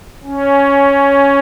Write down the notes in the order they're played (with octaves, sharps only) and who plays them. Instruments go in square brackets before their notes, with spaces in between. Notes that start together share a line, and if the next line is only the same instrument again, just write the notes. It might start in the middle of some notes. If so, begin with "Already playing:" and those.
[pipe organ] C#4